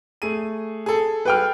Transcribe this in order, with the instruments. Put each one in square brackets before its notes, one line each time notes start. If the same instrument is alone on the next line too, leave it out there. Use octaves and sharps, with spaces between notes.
[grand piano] A3 G#4 D#7
G#4 A4
[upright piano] B4 G5 F6